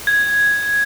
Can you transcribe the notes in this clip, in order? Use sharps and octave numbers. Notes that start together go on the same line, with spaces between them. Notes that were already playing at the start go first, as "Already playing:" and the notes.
G#6